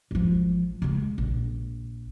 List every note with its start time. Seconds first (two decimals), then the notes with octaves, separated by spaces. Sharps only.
0.11 G#1 F3
0.82 C#3 G#3
1.18 A#1